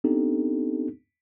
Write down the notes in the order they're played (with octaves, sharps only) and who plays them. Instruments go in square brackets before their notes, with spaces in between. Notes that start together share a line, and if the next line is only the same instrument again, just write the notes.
[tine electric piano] B3 C4 D4 D#4 G4 A4